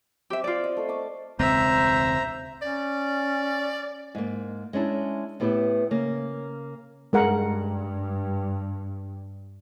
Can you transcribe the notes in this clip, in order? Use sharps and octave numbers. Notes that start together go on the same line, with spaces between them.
C4 G4 E5
F4 D5
D#5
A3 A4
A5 C#6 D6
E1 C#2 C4 C5 E5 A#5
C#4 D5
G#2 A#3
G#3 C#4 D4 E4
A2 B3 E4 G4 G#4 B4
C#3 A#3
G2 G#3 A#4 F#5